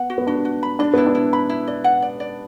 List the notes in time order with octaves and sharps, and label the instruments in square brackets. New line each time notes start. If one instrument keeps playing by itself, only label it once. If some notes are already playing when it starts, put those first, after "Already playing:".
Already playing: [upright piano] B3 [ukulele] F#5
[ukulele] F#4
[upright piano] B3
[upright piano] D4 [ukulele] F#4
[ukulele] F#4
B5
[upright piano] D4 [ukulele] D5
[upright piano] B3 [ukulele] E4
[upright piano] D4
[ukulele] E4
B5
E4
D5
F#5
D5
D5